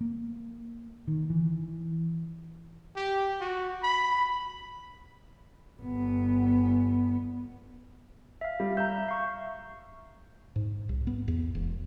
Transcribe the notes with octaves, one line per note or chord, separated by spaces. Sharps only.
A#3
D#3
E3
G4
F#4
B5
G1 B3
E5 F5
G3
E5 A#5 G6
F5 C#6
G#2
C2
B3
E2
E1